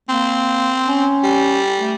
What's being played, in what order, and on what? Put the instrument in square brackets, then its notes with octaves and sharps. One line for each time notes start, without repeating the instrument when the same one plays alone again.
[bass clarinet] A#3 [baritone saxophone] C4
[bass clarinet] C#4
[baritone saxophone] G3
[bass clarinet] A3